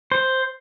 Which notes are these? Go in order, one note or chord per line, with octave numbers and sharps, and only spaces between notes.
C5